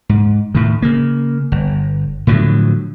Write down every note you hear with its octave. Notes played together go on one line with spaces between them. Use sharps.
G#2
A2 D#3
C#3 A#3
G1
A2 D3 F3 F#3